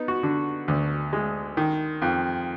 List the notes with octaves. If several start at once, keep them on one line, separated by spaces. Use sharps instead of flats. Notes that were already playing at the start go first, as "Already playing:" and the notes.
Already playing: B3 D#4
F#4
D3
D2
G#3
D#3
F2